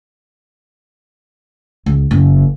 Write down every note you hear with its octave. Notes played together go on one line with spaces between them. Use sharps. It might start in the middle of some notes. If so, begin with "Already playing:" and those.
C#2
F#1